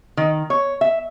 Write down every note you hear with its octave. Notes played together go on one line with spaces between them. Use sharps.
D#3
C#5
E5